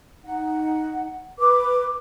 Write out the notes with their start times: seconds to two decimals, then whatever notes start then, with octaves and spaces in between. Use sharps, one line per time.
0.25 D#4 F#5
1.38 B4 D6